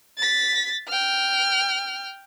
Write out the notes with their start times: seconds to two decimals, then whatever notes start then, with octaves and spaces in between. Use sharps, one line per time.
0.18 A6 B6
0.88 G5 F6